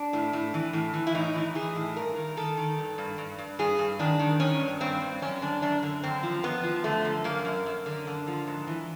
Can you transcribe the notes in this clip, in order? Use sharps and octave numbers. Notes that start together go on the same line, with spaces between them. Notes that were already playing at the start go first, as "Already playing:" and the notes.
Already playing: D4
A2
A2
E3
A2
E3
E4
A2 D#4
E3
E3 G#4
A2
G2 A#4
D#3
D#3 A4
D#3
G2
G2
G2
G2
G2 G#4
G2
D#3 D4
D#3
D#3 C#4
G2
G2 C4
G2
F#2 C#4
D3 D4
F#2 D4
D3
F#2 C4
F3
F#2 B3
F3
D3 A3
F#2
F#2 A#3
F#2
F#2
D3
D3
F3
G#2
E3